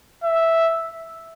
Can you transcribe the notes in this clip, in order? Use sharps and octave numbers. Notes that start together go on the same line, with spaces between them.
E5